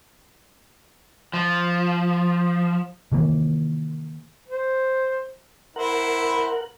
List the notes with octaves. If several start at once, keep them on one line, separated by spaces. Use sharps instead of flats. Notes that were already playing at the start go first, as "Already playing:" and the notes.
F3
C3 D#3 E3 A#3
C5
E4 A#4 C5 F#5